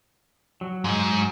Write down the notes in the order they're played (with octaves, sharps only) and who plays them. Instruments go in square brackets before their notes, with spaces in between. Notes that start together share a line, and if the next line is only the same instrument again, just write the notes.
[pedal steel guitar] F#3
[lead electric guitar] G#2